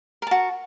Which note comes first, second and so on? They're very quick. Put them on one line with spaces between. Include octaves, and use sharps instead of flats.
A#4 A5 F#4